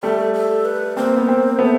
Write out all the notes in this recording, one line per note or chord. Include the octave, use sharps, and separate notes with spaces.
G3 A3 A4
A4
B4
A#3 C4 C5
B3
A#3 C4
A3 B3